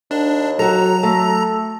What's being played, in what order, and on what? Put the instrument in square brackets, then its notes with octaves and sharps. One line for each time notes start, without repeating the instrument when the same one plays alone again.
[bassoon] D#2 [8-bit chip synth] D4
[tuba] F#3 [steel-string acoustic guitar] F#4 A4 [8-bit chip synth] A#5
[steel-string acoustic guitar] A3 [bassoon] A4